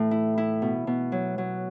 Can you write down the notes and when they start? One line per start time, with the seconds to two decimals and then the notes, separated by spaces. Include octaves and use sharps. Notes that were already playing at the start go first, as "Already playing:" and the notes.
Already playing: A2 E3
0.11 E4
0.38 E4
0.62 B2
0.87 B2
1.12 F#3
1.38 F#3